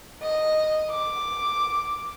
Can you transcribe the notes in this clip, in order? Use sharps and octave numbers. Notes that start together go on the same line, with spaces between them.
D#5
D6